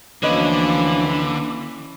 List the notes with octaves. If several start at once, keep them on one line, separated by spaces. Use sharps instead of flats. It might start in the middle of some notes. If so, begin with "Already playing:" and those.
D2 D3 E3 F3 A#3 C#4 B4 D#5